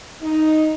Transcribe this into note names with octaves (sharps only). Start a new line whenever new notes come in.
D#4